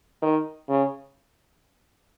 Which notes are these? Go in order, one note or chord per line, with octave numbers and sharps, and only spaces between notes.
D#3
C#3